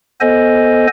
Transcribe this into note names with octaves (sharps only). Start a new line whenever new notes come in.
B3 A4 C5 D#5 G#5